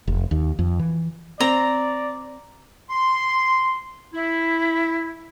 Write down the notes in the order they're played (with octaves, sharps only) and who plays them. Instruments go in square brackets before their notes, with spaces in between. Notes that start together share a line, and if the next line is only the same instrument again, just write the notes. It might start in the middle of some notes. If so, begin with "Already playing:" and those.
[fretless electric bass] F1
D#2
F2
E3
[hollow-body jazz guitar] C4 [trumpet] D5 [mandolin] A#5
[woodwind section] C6
E4